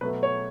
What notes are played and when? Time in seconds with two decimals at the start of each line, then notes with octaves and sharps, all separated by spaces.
0.01 B2 F#3 A3 B4
0.23 C#5